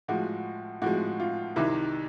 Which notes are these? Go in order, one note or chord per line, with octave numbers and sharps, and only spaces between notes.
A2 F3 G#3 F#4
A2 F3 G#3 F#4
F4
C2 C3 D#3 E4